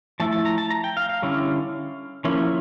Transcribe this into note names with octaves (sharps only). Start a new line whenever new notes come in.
F3 A3 E4 A5
A5
A#5
A5
A#5
G5
F5
F5
D3 G3 C#4 E4
F3 A#3 C#4 E4